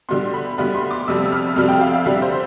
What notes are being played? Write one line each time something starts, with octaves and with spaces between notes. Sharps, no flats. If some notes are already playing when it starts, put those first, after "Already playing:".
D3 G3 B3 C6
B5
D3 G3 B3 B5
C6
D6
F2 C3 G3 E6
E6
F6
F2 C3 G3 F6
G5
F5
F5
D3 G3 D4 E5
C5